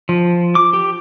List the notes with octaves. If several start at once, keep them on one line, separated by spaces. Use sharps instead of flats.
F3
D6
G4